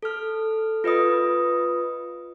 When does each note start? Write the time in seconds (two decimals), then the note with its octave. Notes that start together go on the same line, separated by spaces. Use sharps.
0.03 A4 F6
0.84 F4 B4 D#5 D#6